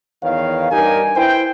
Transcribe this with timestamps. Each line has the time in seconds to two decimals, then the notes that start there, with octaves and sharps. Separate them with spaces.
0.23 E2 D#3 B4 C#5 F5
0.71 G2 D#4 G4 A#4 G#5
1.16 E4 B4 C5 G5